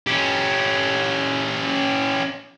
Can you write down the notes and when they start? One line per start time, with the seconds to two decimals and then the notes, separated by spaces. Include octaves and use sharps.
0.07 C#4 G4